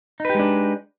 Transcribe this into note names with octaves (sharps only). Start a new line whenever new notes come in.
G#3 D4 D#4 G4 B4